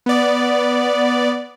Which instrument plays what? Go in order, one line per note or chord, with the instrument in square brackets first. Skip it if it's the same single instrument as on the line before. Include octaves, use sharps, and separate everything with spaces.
[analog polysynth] B3 D5